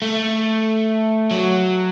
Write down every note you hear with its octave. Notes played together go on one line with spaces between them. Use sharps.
A3
F#3